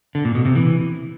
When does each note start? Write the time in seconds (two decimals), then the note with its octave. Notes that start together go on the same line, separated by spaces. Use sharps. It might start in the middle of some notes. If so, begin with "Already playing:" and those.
0.15 D3
0.25 A#2
0.35 B2
0.45 C3
0.55 E3